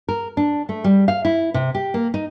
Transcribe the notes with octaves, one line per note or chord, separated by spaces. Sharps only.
A#4
D4
A3
G3
F5
E4
C3
G4
A#3
D#4